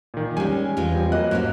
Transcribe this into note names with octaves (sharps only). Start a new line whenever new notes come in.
A#2 D#3
G3 G#3 C#4 G#5
E2 G#3 F4
G3 C4
F#3 A#3 D#5 F#6
G#2 B2 C#4